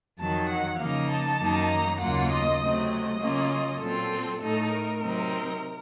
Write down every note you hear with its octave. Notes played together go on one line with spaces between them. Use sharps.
F2 D#3 F#3 A5
F#5
C#3 F3 A#3 D#4 F5
A5
F#2 D#3 F#3 A#3 D#4
A#5
D#2 C#3 F#3 A#3 F4 F#5
D#5
C3 F#3 A3 C4
D#5
C#3 F#3 A#3 C#4 F4
A#2 F#3 C4 F4 A4
A2 A3 D#4 A4
A#4
C3 F#3 C4 D#4